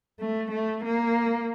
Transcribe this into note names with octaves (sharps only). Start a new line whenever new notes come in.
A3
A3
A#3